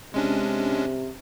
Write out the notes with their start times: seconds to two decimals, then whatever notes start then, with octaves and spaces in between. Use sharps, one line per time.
0.14 C3 G#3 C#4 D4